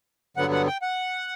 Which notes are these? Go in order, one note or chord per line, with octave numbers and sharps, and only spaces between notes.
G2 D3 F#3 B3 F#5
F#5
G5
F#5